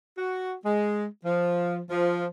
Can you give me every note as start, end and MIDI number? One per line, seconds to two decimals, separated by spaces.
0.18 0.52 66
0.65 1.05 56
1.25 1.79 53
1.89 2.26 53